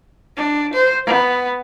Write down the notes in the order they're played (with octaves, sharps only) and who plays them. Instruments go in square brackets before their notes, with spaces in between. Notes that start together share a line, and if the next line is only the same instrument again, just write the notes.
[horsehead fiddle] D4
C5
B3